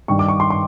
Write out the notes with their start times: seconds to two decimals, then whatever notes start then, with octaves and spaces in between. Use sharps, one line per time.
0.08 G2 D#3 G3 C#6
0.19 D6
0.28 C#6
0.40 C6
0.50 C6